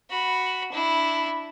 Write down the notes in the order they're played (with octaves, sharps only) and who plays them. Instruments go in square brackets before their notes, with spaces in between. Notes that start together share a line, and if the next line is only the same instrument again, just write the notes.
[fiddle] F#4 B5
D4 E4